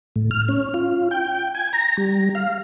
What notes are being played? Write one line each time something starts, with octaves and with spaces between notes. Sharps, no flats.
A2
F6
C#4
F4
G5
G#5
A#5
G3
F5